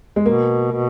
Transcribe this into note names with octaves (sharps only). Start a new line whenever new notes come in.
G#3
B2 A#3
B2